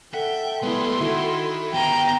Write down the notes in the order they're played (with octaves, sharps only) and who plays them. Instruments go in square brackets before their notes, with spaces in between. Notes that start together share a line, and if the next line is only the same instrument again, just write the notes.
[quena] A4 [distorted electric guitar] E5 [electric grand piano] F#5 [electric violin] G5
[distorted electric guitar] G3 G#3 [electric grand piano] B3 E4 [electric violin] C6
[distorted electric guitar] D#3 [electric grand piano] E4 F#4
[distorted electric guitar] B3 G4 [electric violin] G5 A#5